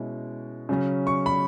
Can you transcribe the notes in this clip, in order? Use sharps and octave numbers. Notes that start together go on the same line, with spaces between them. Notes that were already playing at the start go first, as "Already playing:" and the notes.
Already playing: B2 G#3 C#4 E4
C#3 F#3 C#4
C#6
B5